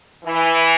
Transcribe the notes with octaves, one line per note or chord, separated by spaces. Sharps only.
E3